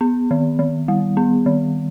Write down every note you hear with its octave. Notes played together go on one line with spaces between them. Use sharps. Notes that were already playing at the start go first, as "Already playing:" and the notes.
B3
D#3
D#3
G3
B3
D#3